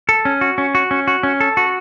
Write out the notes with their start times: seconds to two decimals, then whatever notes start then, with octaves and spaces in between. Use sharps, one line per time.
0.09 A4
0.25 C#4
0.41 F#4
0.58 C#4
0.75 F#4
0.91 C#4
1.07 F#4
1.23 C#4
1.41 A4
1.57 F#4